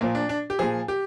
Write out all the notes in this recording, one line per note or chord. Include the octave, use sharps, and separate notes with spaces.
A#2 F3 A#3
D4
D4
G4
A#2 F3 G#4
G4